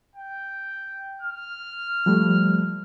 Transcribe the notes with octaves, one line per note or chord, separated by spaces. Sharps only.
G5
F6
F3 G3 A3